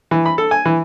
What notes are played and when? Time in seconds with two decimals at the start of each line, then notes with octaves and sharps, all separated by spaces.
0.11 E3
0.26 B5
0.38 A4
0.51 G#5
0.65 E3